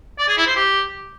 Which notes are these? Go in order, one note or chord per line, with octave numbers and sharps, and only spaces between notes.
D5
G#4
E4
C5
G4